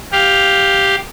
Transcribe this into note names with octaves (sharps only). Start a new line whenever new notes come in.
G4 F5